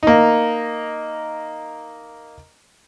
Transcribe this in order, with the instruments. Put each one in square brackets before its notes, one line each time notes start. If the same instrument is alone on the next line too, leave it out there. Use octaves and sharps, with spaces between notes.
[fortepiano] A#3 D#4